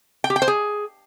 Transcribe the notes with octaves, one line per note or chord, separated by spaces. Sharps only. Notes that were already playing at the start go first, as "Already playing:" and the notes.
G5
G4
G5
C5
G#4